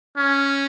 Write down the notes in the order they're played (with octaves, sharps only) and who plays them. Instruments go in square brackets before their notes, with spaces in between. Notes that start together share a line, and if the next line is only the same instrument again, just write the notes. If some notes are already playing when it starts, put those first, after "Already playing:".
[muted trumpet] C#4